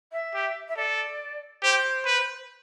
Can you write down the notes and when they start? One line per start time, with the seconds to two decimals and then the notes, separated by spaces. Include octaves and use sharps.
0.12 E5
0.34 G4
0.68 E5
0.77 A4 D5
1.63 G4 C5
2.06 B4